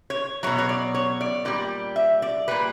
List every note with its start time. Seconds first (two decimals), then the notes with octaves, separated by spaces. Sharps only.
0.10 C#5
0.43 B2 F#3 C#5
0.59 C#5
0.69 D5
0.94 C#5
1.21 D5
1.45 A#2 G3 D5
1.96 E5
2.22 D5
2.48 A#2 G3 B4